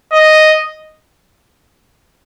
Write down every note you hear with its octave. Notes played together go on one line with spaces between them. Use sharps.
D#5